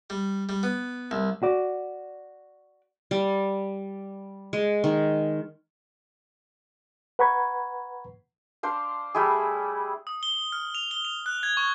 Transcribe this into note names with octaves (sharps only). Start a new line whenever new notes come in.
G3
G3
B3
C2
F#4 D5
G3
G#3
D#3
B4 F#5 A#5 B5 C#6 G#6
D4 C5 F5
G3 A3 E4 G#4
D#6
G7
F6
F7
G7
F7
F#6
G#6
C#6